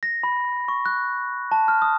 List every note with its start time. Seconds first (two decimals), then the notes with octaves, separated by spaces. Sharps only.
0.03 A#6
0.23 B5
0.68 C#6
0.86 F#6
1.52 A5
1.68 F6
1.82 D#6